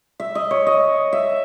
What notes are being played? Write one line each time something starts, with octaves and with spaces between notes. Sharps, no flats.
E5
D#5
C#5
D#5
E5